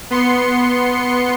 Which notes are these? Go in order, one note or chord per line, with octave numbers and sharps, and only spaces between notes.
B3 C6 C#7